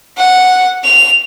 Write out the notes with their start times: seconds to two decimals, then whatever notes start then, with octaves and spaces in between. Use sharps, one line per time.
0.18 F#5
0.84 F7